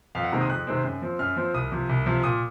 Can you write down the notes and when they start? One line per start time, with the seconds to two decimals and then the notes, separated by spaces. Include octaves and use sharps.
0.15 F2 F5
0.24 F#5
0.32 C3 D#3 G#3 C4 A#5
0.41 D#6
0.49 F2 F#6
0.67 C3 D#3 G#3 C4
0.84 F#2
1.02 F3 C4
1.19 F#2 F6
1.36 F3 C4
1.54 C2 D#6
1.72 C3 F3
1.89 C2
2.06 C3 F3
2.23 A#2 D#6